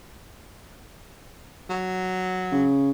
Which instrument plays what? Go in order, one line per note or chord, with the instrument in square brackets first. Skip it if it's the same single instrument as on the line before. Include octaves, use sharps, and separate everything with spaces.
[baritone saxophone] F#3
[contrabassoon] C#3